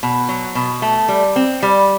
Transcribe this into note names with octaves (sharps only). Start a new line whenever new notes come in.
B2
F#3
B2
A3
G3
C4
G3